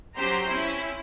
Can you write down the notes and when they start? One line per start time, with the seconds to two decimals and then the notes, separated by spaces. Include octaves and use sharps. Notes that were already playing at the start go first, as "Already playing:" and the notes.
0.17 F#3 C#4 G4 C5 A#5 C6
0.47 C4 C#4 E4